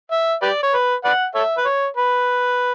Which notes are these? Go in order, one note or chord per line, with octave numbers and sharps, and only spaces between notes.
E5
G4 B4 D5
C#5
B4
B4 D5 F#5
A4 C#5 E5
B4
C#5
B4